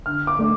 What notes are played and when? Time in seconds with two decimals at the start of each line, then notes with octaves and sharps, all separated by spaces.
0.06 D3 F6
0.27 D6
0.39 A3 D4